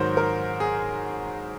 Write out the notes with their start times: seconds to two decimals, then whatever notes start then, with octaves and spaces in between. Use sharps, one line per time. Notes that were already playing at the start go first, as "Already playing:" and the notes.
Already playing: G#2 D#3 F#3 A#4 C5
0.17 A#4
0.60 G#4